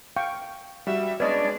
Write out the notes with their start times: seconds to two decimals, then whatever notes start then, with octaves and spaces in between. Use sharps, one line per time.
0.16 F5 G5 C#6
0.87 G3 F#4 E5
1.20 G#3 B3 C#4 D4 B4 D5 D#5 C#6